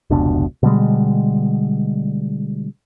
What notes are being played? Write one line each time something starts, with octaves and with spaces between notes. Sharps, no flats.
F1 C#2 B2 D4
B2 D3 G3 G#3